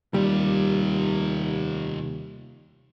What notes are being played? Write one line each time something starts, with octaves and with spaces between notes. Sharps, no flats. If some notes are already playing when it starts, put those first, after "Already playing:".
D#2 C3 G3 F4